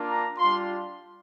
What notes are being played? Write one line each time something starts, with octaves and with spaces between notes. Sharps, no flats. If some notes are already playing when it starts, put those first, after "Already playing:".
Already playing: A#3 D4 F4
A#5
G3 D4 F4 C6